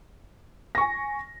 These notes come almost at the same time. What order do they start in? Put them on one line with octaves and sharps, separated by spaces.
A#6 C#6 G#5